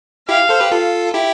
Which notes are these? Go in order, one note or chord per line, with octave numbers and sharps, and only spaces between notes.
E4 G4 F5
A4 C5
G4 B4
F4 A4
E4 G4